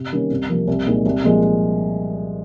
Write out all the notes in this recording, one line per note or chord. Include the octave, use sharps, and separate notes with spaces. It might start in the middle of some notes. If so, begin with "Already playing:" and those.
Already playing: C3
D#3 G3 A#3 C#4
C2
C3 F3 A#3
C2
A#2 G#3 D#4
C2
A#2 F3 G#3